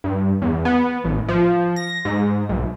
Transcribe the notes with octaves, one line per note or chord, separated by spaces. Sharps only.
G2
E2
B3
A1
F3
A#6
G#2
B1